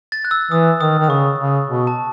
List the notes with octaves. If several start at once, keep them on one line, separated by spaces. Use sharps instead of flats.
A6
F#6
E6
E3 D#6
D#3 D#6
D#3 D#6
C#3 C#6
C#3
B2
A5